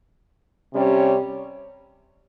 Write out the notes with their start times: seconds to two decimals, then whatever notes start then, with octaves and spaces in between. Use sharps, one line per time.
0.74 C3 G3 C#4 G4 C#5